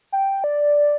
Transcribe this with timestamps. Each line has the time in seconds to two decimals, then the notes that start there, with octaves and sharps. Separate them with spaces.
0.12 G5
0.44 D5